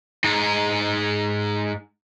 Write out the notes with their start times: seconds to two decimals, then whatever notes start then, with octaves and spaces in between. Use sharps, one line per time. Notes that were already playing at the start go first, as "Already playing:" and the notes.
0.24 G#2 D#4